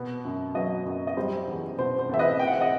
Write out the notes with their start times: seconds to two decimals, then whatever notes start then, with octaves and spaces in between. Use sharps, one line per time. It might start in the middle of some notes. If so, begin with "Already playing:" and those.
Already playing: B2 B3
0.25 F#2
0.54 F#3 B4 D#5
0.86 F#2
1.07 D#5
1.17 G3 C5
1.48 E2
1.78 B2 C5
1.99 C5
2.09 E2 E5
2.19 B4 D#5
2.39 C4 G5
2.47 F#5
2.54 E5
2.60 D#5 F#5